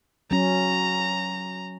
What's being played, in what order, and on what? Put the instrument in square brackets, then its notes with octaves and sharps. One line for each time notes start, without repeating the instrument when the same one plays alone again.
[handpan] F#3 C#4 [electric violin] A#5